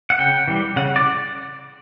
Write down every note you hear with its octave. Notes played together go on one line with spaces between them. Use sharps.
F#5
C#3 G5
E3 G3
C#3 F#5
D5